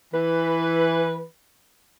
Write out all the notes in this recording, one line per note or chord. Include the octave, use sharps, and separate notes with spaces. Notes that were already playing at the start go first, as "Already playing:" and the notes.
E3 B4